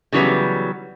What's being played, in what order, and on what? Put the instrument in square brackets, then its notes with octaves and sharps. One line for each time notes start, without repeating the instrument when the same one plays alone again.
[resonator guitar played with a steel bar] C#3 E3 F#3 G3 B3